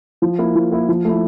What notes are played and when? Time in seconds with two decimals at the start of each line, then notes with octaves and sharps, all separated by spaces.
0.22 F3
0.39 A#3 E4
0.55 F3
0.72 A#3 E4
0.89 F3
1.04 A3 E4